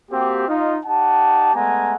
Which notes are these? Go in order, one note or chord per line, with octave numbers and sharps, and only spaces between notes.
A#3 C4 F#4 G4
D#4 F4
D#4 G4 F#5 A5
G#3 A3 B3 F#5 G#5 A#5